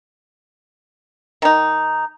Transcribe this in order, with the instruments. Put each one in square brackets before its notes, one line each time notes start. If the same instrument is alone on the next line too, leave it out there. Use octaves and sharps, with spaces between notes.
[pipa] D#3 D#4